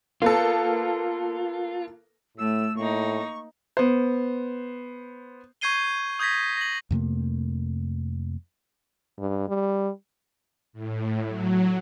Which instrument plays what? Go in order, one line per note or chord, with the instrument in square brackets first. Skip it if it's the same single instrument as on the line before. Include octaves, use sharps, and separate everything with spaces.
[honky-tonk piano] A#3 B3 A4 [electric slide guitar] F4
[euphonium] A2 [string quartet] A3 [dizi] E6
[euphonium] A2 [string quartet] A#3 D#4 [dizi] C#6
[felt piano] B3 C5
[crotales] C#6 G6 G#6 C7 D#7 G7
D#6 G6 G#6 A#6 B6
A#6 F#7
[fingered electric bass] F2 C3 A3 A#3
[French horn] G2
G3
[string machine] A2
F#3